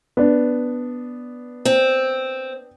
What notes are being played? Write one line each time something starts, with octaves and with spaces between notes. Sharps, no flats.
B3 D4
C4